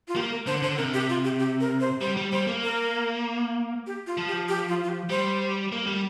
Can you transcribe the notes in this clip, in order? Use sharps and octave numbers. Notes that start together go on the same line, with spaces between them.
F4
A#3 G4
A#4
D3 C5
D3 C5
C3 A#4
G4
F4
G4
G4
A#4
C5
G3 C5
G3
G3 C5
A#3
A#4
G4
F4
F3
G4
G4
F4
F4
G4
G3 C5
A#3
G3